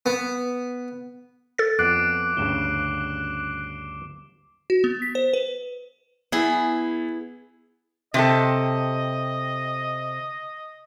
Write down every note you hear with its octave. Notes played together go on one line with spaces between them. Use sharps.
B3
A4 A6
F2 B3 D6 F#6 C7 D7
D2 G2 C#3 E7 G7
F#4
B3
B6
C5
B4
B3 E4 G#4
C3 G4 A4 D#5